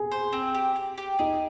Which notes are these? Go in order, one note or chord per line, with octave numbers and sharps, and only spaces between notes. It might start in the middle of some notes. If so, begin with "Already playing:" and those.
Already playing: G#4
C5
C4
G4
G4
G4
D#4 G#4